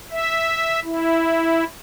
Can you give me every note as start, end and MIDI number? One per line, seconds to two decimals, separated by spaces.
0.11 0.80 76
0.85 1.64 64